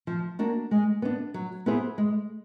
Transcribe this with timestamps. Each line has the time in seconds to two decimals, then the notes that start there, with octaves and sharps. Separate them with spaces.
0.07 F3
0.39 A#3 D4 F#4
0.71 G#3
1.02 B3 D4
1.34 F#3
1.66 B3 E4 G#4 C5
1.98 G#3